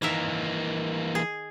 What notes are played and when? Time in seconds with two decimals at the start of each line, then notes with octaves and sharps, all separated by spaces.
0.02 D#3 E3 A#3 A#4 E5
1.15 G#4